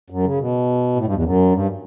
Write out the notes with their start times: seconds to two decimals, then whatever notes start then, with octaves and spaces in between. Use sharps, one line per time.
0.10 F#2
0.24 C#3
0.39 B2
0.96 A2
1.04 G2
1.13 E2
1.23 F#2
1.52 G2